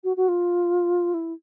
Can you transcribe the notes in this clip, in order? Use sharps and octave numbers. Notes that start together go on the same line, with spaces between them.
F#4
F#4
F4
E4